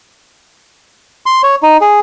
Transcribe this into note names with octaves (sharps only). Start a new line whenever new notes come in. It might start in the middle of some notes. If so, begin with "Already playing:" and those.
C6
C#5
D#4
G#4